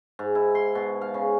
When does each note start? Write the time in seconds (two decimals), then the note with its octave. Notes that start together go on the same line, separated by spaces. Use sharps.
0.19 G#2
0.35 E4
0.55 C6
0.75 B2
1.01 F5
1.14 C#3